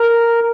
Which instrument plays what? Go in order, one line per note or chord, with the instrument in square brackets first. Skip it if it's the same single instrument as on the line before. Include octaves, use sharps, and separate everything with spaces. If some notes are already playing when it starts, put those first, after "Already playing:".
Already playing: [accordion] A#4